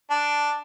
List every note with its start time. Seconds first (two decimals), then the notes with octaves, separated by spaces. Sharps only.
0.10 D4